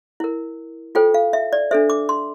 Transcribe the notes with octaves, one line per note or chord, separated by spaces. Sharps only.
E4 A#4
F4 A4 C5 G5
F5
E5
D5
D4 A4 C5 E5
D6
C6